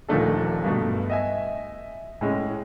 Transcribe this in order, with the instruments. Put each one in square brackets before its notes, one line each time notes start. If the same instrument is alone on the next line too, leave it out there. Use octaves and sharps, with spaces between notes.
[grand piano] D#1 D#3 F3 A3 D4 A4
G2 B2 A3
D#5 E5 G#5
A2 G#3 C#4